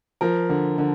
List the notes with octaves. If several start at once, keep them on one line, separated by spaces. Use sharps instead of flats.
F3 A#4
D3
D3